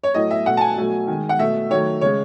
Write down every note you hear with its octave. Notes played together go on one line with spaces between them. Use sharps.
C#5
A2 F#3 A3 D#5
E5
B2 A3 F#5
A5
G#5
B2 F#3 A3
D#3
G#3
F#5
B2 A3 E5
D#3 F#3 A3 C#5
C#3 G#3 C#5